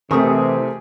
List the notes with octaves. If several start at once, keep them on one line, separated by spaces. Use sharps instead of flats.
C3 E3 A3 G4 G#4 A#4 C#6 D#6